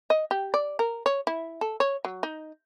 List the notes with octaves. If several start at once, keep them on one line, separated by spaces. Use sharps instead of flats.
D#5
G4
D5
A#4
C#5
E4
A4
C#5
F#3
D#4